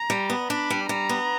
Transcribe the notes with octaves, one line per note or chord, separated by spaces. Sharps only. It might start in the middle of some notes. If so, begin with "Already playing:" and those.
Already playing: A#5
G3
B3
D4 B5
G3
G3 A#5
B3